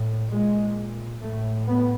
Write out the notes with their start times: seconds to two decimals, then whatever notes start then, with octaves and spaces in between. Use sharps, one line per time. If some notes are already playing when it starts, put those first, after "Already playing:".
Already playing: A2
0.31 A#2 G#3
1.22 A2 A3
1.67 B3